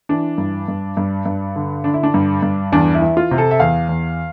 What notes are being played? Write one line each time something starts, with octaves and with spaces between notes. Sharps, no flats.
E3 D4
G2
G2
G2
G2
D3
D3 D4
E4
D4
G2
G2
E2 D4
E4
E3
F4
C3
A4
E5
E2 F5
E2